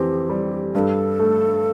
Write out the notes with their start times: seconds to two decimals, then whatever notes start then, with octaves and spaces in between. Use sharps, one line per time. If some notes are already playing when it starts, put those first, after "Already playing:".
Already playing: F2 E3 C4 G4
0.29 G3
0.75 G2 B4
0.79 A4
1.19 A3